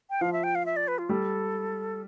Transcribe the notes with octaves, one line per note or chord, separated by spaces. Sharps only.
G5
F3 F5
E5
G5
F5
E5
D5
B4
F4
G3 A4